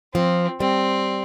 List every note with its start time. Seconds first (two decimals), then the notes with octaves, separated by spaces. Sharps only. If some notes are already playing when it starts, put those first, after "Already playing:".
0.14 F3 C4
0.60 G3 C4